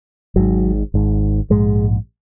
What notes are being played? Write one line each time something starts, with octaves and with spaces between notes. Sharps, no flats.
G#1 G#2 F#3
G#1 G#2
A#1 G#2 G#3